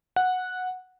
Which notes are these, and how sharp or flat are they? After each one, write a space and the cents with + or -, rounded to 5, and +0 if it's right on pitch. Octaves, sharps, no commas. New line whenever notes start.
F#5 -10